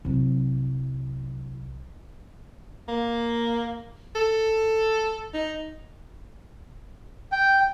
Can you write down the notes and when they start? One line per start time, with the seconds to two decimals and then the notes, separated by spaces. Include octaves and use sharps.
0.05 C2 F#3
2.88 A#3
4.16 A4
5.34 D#4
7.32 G5